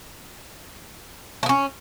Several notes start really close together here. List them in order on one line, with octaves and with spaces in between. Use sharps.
A3 B3 C#4